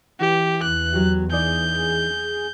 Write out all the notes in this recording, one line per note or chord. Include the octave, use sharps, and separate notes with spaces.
E3 G4
E2 F#6
F#3 G4
E3 D#4 G#4 D5 G6